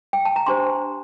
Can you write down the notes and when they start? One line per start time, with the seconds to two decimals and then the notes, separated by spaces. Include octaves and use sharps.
0.13 G5
0.25 A5
0.36 A#5
0.46 D4 G4 C5 C6